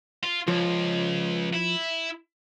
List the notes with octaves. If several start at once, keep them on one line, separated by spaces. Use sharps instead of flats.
F4
C#2 F3
E4